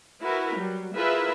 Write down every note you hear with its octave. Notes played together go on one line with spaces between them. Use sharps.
E4 F#4 A#4 B4
F#3 G3
E4 F4 G#4 A#4 B4 E5